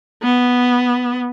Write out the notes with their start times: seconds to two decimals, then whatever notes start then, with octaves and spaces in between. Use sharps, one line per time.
0.23 B3